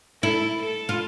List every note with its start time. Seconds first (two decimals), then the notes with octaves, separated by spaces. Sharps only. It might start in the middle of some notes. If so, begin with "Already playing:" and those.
0.23 E4 A4
0.61 A4
0.89 F4